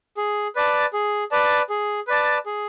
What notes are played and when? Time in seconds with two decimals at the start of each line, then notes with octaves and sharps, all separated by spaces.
0.17 G#4
0.56 B4 D5 A5
0.93 G#4
1.31 B4 D5 A5
1.70 G#4
2.08 B4 D5 A5
2.46 G#4